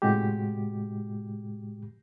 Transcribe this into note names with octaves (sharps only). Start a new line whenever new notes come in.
A2 C3 G#3 F#4 G4